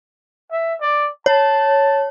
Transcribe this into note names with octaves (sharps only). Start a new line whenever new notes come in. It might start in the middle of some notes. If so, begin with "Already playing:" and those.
E5
D5
C#5 A5